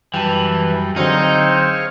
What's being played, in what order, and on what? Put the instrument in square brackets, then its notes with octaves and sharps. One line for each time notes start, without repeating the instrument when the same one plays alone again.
[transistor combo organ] F#2 G3 [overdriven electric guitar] E3 [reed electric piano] G5 A5
[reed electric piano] D3 F#3 [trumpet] C4 [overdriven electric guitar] D#4 [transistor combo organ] G#4 C#5 F5